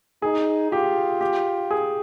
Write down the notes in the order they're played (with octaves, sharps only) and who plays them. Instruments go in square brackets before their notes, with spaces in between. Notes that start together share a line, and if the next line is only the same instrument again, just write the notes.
[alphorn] D#4 [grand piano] G#4
[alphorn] F4 [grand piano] G4
[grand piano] G4
G#4